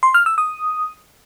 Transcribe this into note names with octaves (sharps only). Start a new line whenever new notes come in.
C6
F6
E6
D#6